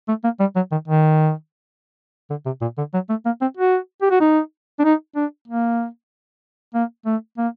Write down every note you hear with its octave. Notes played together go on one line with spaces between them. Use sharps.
A3
A#3
G3
F#3
D#3
D#3
D3
C3
A#2
D3
F#3
A3
A#3
C4
F#4
G4
F#4
D#4
D4
D#4
D4
A#3
A#3
A3
A#3